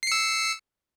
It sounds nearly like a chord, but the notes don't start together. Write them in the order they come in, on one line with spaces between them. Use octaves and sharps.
C7 C#7 E6